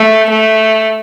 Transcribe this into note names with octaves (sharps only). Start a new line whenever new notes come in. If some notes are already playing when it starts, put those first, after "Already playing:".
Already playing: A3
A3